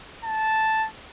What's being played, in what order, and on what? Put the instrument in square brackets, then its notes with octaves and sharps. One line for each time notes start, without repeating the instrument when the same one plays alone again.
[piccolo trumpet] A5